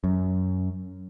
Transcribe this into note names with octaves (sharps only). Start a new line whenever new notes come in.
F#2